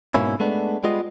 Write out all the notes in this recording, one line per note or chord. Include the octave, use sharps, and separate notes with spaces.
G#2 B2 A#3 C#4 E4
G#3 A3 B3 D4
G3 G#3 B3 F4 D#5